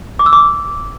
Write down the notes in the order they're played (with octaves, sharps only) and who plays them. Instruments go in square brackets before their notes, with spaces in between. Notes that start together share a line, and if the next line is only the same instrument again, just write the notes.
[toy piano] D6
E6
D6